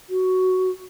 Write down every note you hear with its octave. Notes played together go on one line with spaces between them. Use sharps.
F#4